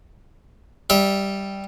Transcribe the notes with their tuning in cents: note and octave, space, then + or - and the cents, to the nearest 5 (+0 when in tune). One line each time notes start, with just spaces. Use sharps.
G3 +0 E5 -30